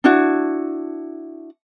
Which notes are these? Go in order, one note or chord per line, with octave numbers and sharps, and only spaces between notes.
D4 E4 F#4